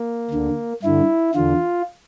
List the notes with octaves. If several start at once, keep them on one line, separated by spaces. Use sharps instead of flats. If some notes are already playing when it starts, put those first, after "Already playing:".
Already playing: A#3
D2 D3
G2 D3 E4
E2 D3 F4